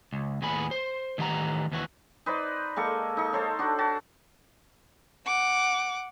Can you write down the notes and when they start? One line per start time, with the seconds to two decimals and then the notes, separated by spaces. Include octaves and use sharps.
0.13 C#2
0.42 D#2 A2 B3 G#4 B5
0.71 C5
1.18 A2 D#3 E3 G4 F#5 A#5
1.71 D#2 E3 F#4
2.26 D#4 B4 C5 D5
2.76 G#3 A#3 A4 C#6
3.17 D#4 C#6
3.33 A4 C5 C#5
3.59 D4 F#4
3.79 F#4 A5
5.26 F#5 D6